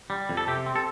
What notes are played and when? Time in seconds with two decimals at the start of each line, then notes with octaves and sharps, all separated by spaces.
0.10 G3
0.29 F2
0.37 A4
0.47 C3 G4
0.66 C4
0.76 A4